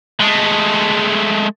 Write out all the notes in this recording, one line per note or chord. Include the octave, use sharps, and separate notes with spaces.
G#3 A3